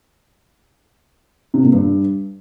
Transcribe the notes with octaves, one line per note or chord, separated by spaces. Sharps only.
C3
A#2
G2